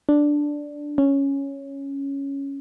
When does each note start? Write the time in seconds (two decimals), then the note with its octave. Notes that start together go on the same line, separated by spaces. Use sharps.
0.09 D4
0.98 C#4